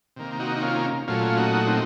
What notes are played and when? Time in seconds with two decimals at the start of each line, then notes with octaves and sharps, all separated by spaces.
0.16 C3 D#3 A#3
0.39 D#4 F#4
0.57 D#4
0.62 C#4 F4
1.07 A#2 F#3 A3 C#4 F4
1.37 D#4 F#4
1.67 C4 D#4